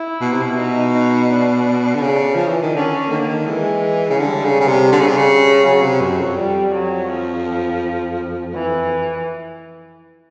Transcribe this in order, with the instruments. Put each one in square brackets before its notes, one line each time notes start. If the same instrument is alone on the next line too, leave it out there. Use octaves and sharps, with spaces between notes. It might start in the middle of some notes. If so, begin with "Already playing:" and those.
Already playing: [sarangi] E4
[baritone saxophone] B2
C3
B2
[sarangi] D#4
D4
[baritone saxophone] D3
C#3
F3
E3
D#3
[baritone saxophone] D3 [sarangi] C#4
[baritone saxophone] D#3 [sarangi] A#3
[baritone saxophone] D3
D#3
[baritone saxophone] E3 [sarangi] G#3
[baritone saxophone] C#3
[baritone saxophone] D3 [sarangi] G3
[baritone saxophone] C#3
C#3
C3
D3
C#3
C3
C#3
[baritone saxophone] C#3 [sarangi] F#3
[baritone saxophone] C3
[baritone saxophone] F#2 [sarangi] F#3
[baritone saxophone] F2
[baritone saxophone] F2 [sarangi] G3
[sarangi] F#3
F3
E3